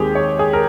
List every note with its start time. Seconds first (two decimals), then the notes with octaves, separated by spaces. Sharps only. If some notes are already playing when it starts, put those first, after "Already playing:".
Already playing: D#2 D#3 G#3 C4 G4 G#4
0.15 C#5
0.39 G#4
0.53 A#4